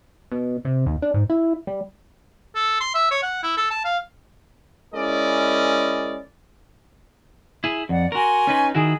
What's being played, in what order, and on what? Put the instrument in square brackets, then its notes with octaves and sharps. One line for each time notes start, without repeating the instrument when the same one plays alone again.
[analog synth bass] B2
C3
D#2
D4
G#2
E4
G3
[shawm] A4
C6
E5
C#5
F#5
E4
A4
A5
F5
[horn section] G#3 C#4 E4 A#4 D5 D#5
[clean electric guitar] E4 G#4
[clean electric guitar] F2 [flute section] D5 F#5
[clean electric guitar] F#4 A#4 [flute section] G#5 C6 C#6
[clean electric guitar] C#4 D#4 B4
[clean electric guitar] D#3 E4 F#4 [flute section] G#4